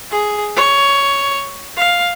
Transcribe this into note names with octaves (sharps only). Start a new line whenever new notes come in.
G#4
C#5
F5